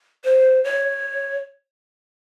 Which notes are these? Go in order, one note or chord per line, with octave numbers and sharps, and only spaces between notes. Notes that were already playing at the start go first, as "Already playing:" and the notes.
C5
C#5